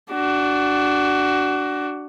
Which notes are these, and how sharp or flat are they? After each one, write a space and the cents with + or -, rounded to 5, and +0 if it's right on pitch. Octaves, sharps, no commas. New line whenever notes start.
D4 +0 F#4 +20